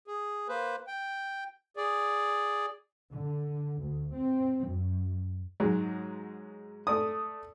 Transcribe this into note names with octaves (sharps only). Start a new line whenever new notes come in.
G#4
A#3 B4 C5
G5
G#4 D5
D3
D2
C4
F#2
G#2 F#3 G#3
A3 D5 D#6